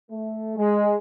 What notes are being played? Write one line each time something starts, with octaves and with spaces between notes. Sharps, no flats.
A3
G#3